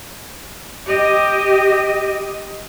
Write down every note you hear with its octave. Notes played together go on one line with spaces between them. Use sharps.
G4 D#5